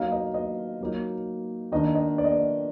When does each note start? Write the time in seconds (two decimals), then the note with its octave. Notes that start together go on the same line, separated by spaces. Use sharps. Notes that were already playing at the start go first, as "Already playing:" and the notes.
Already playing: F#3 A#3 D#4 F5
0.12 D#5
0.34 D#5
0.81 F#3 A#3 D#4
1.72 D#3 A#3 D4 D#5
1.95 D#5
2.18 D5
2.24 D#5
2.32 D5